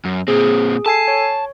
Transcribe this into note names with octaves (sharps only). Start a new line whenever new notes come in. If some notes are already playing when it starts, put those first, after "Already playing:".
F#2
A#2 C4 G#4
A4 G#5 A5 C7
C#5